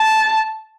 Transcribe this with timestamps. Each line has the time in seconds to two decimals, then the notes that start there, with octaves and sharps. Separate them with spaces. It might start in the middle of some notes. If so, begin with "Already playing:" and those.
Already playing: A5